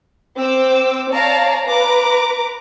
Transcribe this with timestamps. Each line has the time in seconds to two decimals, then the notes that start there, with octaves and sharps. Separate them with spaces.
0.38 C4 D6 E6
1.12 C#5 D5 F5 A5 A#5
1.66 B4 A#5 D6